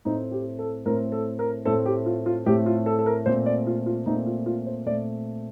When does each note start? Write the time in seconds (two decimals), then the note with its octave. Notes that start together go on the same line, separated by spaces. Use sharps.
0.05 A2 A3 C4 D#4
0.32 G4
0.59 A4
0.85 A2 A3 C4 A#4
1.12 A4
1.39 A#4
1.65 A2 A3 C4 A4
1.86 G4
2.06 F4
2.26 F4
2.46 A2 A3 C4 G4
2.66 F4
2.86 A4
2.99 A4
3.06 A#4
3.26 A#2 A3 C4 C5
3.46 D5
3.67 F4
3.86 F4
4.06 A#2 A3 C4 D#4
4.26 F4
4.46 F4
4.66 C5
4.86 A#2 A3 C4 D5